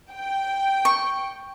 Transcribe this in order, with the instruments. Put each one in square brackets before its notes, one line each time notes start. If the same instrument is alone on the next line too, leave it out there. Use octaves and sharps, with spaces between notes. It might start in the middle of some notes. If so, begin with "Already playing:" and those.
[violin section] G5
[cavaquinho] C#6